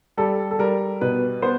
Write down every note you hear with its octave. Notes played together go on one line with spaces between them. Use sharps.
G3 A4
A4
G3 A#4
B2 B4
B3 C5